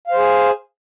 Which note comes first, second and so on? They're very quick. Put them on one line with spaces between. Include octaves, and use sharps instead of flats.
F5 C5 G#4